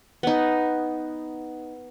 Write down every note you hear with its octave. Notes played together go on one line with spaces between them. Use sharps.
B3 D#4